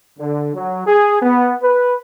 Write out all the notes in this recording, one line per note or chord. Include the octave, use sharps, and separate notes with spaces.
D3
F#3
G#4
B3
B4